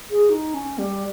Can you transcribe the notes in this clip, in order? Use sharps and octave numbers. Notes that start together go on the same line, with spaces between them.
G#4
D#4
C#4
G3